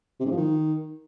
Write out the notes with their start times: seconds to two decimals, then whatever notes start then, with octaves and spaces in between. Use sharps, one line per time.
0.20 C3
0.26 G#2
0.31 F3
0.37 D#3